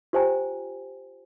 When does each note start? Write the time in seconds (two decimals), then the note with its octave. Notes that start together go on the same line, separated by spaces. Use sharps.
0.13 F4 G4 C5 G5 G#5 A#5